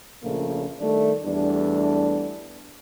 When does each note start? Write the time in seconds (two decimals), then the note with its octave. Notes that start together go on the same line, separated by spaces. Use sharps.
0.23 A#1 A#2 C#3 A3 A#3
0.80 D#3 G3 A3 D4
1.24 E2 G3 A3 D4